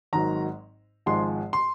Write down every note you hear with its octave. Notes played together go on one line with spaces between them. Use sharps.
G#1 G#2 D#3 F#3 A#5
G#1 G#2 F3 G#3 C6
C6